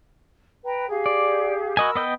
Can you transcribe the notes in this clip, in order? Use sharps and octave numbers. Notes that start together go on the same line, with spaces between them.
B4 G5 A#5
G4 G#4 F5
D5
F#4 A#4 D#5 G#5 B5 E6
B3 D#5 G5